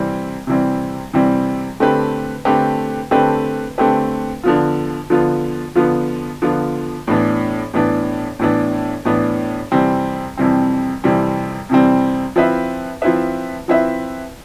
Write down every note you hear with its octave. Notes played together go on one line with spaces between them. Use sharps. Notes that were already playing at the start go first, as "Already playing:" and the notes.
Already playing: C3 E3 G3 C4
C3 E3 G3 C4
C3 E3 G3 C4
D3 A3 C4 G4 B4
D3 A3 C4 G4 B4
D3 A3 C4 G4 B4
D3 A3 C4 G4 B4
D3 F3 B3 F4
D3 F3 B3 F4
D3 F3 B3 F4
D3 F3 B3 F4
A2 E3 B3 D4
A2 E3 B3 D4
A2 E3 B3 D4
A2 E3 B3 D4
F2 C3 E3 G3 C4
F2 C3 E3 G3 C4
F2 C3 E3 G3 C4
F2 C3 E3 G3 C4
F3 C4 E4 B4 E5
F3 C4 E4 B4 E5
F3 C4 E4 B4 E5